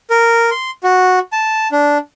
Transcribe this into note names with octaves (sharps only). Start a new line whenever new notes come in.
A#4
C6
F#4
A5
D4